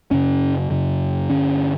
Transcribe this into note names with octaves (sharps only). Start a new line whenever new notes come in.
F#2 C#3 C#4
F#2 C#3
G2 D3 C#4